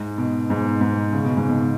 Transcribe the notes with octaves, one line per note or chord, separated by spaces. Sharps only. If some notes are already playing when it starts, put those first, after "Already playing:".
Already playing: G#2
B2
G#2
G#2
C#3
B2
G#2
B2